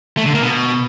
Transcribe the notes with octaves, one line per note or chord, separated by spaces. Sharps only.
A3
D3
A#3
B2